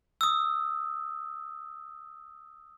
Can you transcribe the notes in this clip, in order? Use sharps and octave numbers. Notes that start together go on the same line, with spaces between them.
D#6 E6